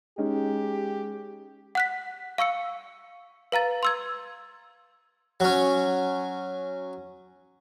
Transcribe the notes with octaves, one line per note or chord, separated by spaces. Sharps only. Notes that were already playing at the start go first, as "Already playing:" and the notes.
G#3 C#4 D#4 G4
F#5 F#6 B6
F5 C#6 E6 C#7
B4 F5 A#5 A6
C6 E6 G#6
F#3 C#4